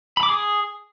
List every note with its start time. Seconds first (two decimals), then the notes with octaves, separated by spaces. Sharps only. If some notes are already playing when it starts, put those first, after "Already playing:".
0.17 B5
0.23 D6
0.29 G#4